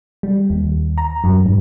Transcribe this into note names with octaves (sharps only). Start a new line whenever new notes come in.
G3
D#2
A#5
F#2
G2